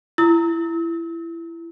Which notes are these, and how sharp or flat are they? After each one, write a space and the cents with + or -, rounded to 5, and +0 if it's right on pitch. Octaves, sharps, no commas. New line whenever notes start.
E4 +25 E6 -40